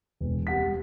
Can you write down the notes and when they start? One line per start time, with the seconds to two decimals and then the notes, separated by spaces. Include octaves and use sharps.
0.20 E1
0.47 G3 F#5 B6